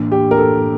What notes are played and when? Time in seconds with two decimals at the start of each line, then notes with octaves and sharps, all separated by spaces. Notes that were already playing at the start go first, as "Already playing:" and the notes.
Already playing: A2 E3 A#3 D4
0.12 G4
0.31 A#4
0.38 A4